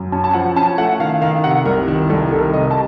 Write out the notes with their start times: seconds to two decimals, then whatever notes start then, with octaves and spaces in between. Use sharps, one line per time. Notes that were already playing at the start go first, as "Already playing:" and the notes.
Already playing: F#2
0.12 C#4 A5
0.24 A5
0.34 F3 F#5
0.56 C#4 A5
0.78 A3 F#5
1.00 D#3 F5
1.21 D#3 F5
1.43 C3 F#5
1.65 C2 A#4
1.88 D#3
2.10 C2 A4
2.31 D#3 A4
2.39 A#4
2.53 C3 D#5
2.71 A5